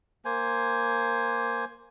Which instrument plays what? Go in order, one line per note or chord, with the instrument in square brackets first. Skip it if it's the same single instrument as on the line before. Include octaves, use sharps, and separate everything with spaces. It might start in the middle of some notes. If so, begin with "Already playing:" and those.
[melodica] A#3 C5 G#5